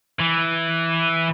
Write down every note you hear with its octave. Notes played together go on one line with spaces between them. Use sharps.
E3